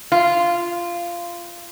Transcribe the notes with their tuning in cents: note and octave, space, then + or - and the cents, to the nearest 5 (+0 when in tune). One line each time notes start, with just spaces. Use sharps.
F4 -15